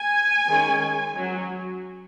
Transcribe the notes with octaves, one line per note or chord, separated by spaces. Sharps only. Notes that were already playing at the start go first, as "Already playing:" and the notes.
Already playing: G#5
D#3 G#3 C#4
F#3 C#4